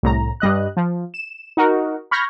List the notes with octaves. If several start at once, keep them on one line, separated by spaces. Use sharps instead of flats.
C2 A2 A#5
G2 G3 D#5 F#6
F3
E7
D#4 F#4 A#4
B5 C#6 F6 G6 G#6 A#6